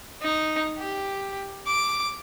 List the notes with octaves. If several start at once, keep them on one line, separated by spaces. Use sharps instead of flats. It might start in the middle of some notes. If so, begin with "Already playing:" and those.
D#4
G4
D6